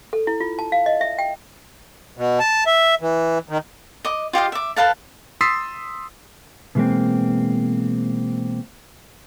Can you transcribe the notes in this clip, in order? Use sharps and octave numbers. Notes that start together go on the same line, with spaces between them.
A4
E4
F4
A5
F5
D#5
E5
G5
B2
A5
E5
E3
D#3
D#5 D6
F4 G4 D#5 F5
E5 D6
A4 B4 F5 A5
C6 D#6 E6 A6 B6 C7
B2 E3 G#3 A#3 C4